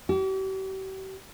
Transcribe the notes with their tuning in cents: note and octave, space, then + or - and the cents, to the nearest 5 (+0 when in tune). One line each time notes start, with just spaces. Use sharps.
G4 -45